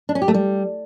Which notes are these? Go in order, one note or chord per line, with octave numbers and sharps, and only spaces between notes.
D4
C#4
G4
A3
G3